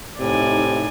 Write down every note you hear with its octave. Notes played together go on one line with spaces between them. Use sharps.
A2 C3 D#4 D5 G#5